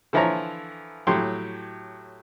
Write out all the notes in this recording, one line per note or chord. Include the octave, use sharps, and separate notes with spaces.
D3 E3 F3 E4 C#5 A#5
A2 F#3 G4 C6